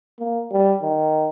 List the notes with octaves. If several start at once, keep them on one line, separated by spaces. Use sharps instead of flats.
A#3
G3
D#3